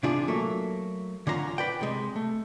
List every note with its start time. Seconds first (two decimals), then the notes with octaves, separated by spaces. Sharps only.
0.03 C3 E3 D4 F4 G#4
0.28 F#3 A3 A#3
1.27 D3 C#4 F4 A#5
1.58 B4 D5 G5
1.81 C3 G#3
2.16 A3